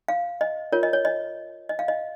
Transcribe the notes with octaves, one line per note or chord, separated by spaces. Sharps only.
F5
D#5
F4 A#4 C#5
D#5
C#5
D#5
D#5
F5
D#5